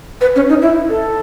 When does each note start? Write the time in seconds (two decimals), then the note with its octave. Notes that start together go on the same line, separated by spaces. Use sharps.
0.21 B4
0.36 C#4
0.49 D#4
0.62 E4
0.89 A4